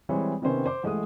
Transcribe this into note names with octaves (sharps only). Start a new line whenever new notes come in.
E3 G3 G#3 C4 C#5
C3 D#3 B3 C#4 C5
C5 D6
A1 G#3 A3 D#6